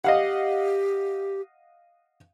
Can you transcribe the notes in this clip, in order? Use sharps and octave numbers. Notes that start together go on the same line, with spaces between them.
G4 D#5 F5 F#5